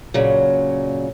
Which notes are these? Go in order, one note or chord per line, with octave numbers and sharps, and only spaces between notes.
A#2 C#3 F#3